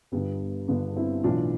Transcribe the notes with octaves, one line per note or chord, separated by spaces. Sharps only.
G1 G2 D3 G3 B3
G1 G2 D3 B3 D4
C4 E4
B1 A2 E3 D4 F4